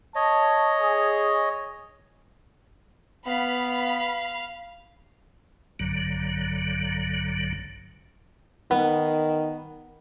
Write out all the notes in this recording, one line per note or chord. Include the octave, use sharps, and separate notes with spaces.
C#5 D#5 A5
G#4
B3 F5 B5
A#1 G2 D3 F#3
D#3 B3